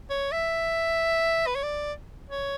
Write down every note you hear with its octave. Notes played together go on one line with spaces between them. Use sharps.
C#5
E5
B4
C#5
D5
C#5